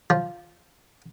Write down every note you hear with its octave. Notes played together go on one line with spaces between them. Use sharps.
F3